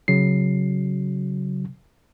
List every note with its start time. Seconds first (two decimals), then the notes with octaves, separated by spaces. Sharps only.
0.08 C#3 F#3 C7